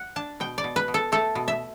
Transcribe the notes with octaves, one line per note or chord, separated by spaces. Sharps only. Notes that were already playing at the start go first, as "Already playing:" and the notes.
Already playing: F#5
D4 A5
B2 G5
D5
B2
B4
B2
A4
A3 A4
B2
E5